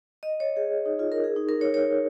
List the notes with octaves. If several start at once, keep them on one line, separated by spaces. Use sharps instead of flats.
D#5
C#5
G#4
D#4
F4
A#4
G#4
D#4
A#4
C#5
C#5